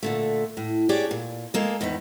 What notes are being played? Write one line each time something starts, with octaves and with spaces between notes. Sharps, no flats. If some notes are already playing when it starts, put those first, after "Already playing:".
A#2 D3 A3
A2
D4 G4 G#4 C#5 D5
A#2
G#3 A#3 A4
E2 G#2 D#3 B4